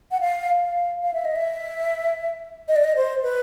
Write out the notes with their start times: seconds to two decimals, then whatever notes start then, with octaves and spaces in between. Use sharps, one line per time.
0.11 F#5
0.21 F5
0.62 F5
1.03 F5
1.14 E5
1.25 D#5
1.36 E5
2.68 D#5
2.76 D5
2.84 D#5
2.96 C5
3.23 B4